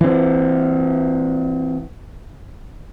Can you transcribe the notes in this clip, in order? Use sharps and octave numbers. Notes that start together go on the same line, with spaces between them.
E3 C4